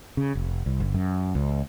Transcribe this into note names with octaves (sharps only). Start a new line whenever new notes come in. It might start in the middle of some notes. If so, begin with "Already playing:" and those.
C#3
F1
C2
G1
F#2
C#2